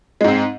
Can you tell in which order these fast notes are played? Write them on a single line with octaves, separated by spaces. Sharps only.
G#3 G#2 C4